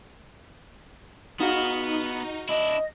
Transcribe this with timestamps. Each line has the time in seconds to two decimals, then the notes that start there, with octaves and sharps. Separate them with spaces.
1.40 B3 D#4 F4 F#4 G#4
2.49 D4 E4 D#5